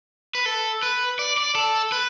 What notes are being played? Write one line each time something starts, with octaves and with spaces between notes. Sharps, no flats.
B4
A4
B4
D5
D5
A4
B4